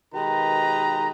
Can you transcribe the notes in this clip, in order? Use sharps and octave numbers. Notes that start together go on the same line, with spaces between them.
B2 D#3 G#3 G4 B4 A#5